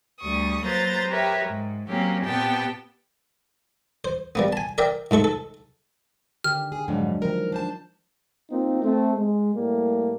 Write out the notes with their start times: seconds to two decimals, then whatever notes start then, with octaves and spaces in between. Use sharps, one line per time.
0.19 D2 G3 C#6 D#6
0.63 F#3 A#3 B4 C5 A#5 A6
1.09 G4 A#4 B4 C#5 E5 G5
1.45 G#2
1.89 F#3 A#3 C4 C#4 G4
2.25 A#2 B3 C4 G4 G5 A5
4.05 C5
4.35 G3 A#3 B3
4.53 G#5 A5
4.78 A#4 D5 E5 G5
5.11 G#2 A3 A4 C#6
5.24 A4
6.44 D3 D#3 G4 F6
6.72 G#4
6.88 F2 G#2 D3 F#3 G#3 D4
7.22 D#3 F3 A#4 A#5
7.52 D4 C5 A5
8.50 A#3 C4 D#4 F4
8.82 A3 C4
9.15 G#3
9.54 A2 G3 A#3